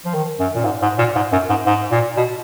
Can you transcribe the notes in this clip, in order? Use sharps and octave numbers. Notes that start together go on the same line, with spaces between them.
F3
D#3
F#2
A#2
G#2
G#2
A#2
G#2
F#2
G#2
G#2
A#2
B2